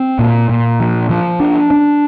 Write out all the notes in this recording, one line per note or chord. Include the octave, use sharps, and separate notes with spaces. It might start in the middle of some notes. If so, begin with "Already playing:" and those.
Already playing: C4
A#2
A#2
F3
F3
D4
D4